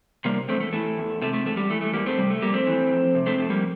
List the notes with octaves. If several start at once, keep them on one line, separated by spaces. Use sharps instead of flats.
C3 G3 A#3
E2 A3 C4
A3
E3 A3
E2
C3 A3
A3
E2 A3
G3
E3 A3
A3
E2 G3 A#3
A3 C4
C3 G3
A3
F2 G3 A#3
A3 C4
E3
F2
C3
A3 C4
F2 A3
G3 A#3